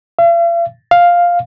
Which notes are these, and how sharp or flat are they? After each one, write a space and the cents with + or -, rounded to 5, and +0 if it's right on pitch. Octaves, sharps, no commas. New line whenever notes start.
F5 -45
F5 +5